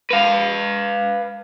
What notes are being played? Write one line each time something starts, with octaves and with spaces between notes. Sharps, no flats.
B4 F5